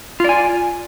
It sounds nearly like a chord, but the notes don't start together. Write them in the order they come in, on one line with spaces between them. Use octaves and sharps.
F4 D5 G#5